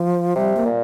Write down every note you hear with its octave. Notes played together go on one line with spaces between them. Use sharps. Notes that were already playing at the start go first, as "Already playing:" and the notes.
Already playing: F3
C3 G3
A#3
A#2